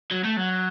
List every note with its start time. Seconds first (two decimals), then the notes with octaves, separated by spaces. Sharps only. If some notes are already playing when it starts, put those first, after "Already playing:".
0.11 F#3
0.24 A3
0.37 F#3